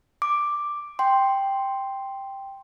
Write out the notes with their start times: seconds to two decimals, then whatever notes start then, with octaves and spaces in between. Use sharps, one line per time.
0.22 D6
0.99 G5 C6